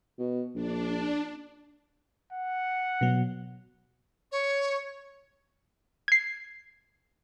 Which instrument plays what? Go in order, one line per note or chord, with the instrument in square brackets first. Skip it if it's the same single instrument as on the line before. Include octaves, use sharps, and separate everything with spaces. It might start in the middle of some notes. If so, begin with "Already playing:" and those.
[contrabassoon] B2
[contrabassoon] A#1 [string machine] D4
[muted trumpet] F#5
[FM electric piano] B2 F#3
[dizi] C#5
[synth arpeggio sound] G#6 C7